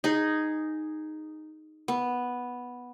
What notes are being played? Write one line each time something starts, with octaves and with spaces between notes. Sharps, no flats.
D#4 G#4
B3